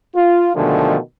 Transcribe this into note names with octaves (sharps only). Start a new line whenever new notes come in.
F4
B2 D3 D#3 F3 G#3 A3